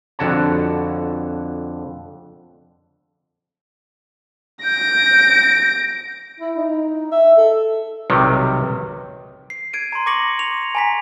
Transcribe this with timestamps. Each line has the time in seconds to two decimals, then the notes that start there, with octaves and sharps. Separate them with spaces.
0.19 F2 D3 F#4 C#5 A5
4.64 G6 A#6 D7
6.40 E4
6.57 D#4
7.12 E5
7.38 A4
8.10 B1 C3 D#3 F#3 G3
9.50 C7
9.73 G#6 D7 D#7
9.92 A#5 C6
10.06 C#6 D6 A#6 C#7 F#7
10.39 F7
10.75 G#5 A#5 B6